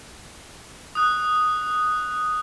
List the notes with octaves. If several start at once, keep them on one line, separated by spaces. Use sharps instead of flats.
D#6 F#6